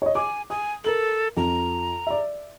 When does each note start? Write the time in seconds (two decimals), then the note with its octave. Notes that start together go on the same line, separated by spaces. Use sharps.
0.02 C#5 D#5
0.15 G#5 D6
0.50 G#5 D#6
0.84 A4 A#4 F#7
1.37 F2 A#5
2.07 D5 E5